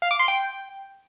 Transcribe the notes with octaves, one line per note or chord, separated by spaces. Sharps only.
F5
D6
C6
G5